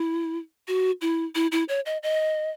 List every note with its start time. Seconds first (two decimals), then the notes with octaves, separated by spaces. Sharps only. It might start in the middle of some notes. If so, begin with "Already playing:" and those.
Already playing: E4
0.68 F#4
1.01 E4
1.35 E4
1.52 E4
1.69 C#5
1.86 D#5
2.03 D#5